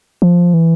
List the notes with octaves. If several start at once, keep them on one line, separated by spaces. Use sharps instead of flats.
F3
E3